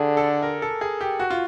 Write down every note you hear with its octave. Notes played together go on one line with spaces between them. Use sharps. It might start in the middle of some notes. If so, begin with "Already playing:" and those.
Already playing: D3 G4 G#4
A4
A#4
A4
G#4
G4
F#4
F4